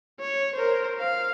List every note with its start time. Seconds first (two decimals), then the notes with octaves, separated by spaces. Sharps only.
0.20 C#5
0.55 A#4 C5
0.99 F5